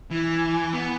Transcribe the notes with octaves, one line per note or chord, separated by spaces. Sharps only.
E3
B3